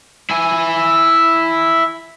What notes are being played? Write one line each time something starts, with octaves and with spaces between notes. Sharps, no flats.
E4 G#5